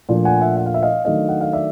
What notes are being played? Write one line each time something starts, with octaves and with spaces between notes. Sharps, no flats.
A#2 F3 A3 D4
F#5 G#5
E5 F#5
F#5
F5
E5
D#5 F5
D#3 F#3 A3 D4 D#5 F5
F#5
F5
D5 E5